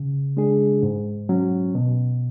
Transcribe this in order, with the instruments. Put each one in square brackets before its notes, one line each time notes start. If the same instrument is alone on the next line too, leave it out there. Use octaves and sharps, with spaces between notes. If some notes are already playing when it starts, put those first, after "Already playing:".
Already playing: [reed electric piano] C#3
G#3 D4 G#4
G#2
F#3 C#4
B2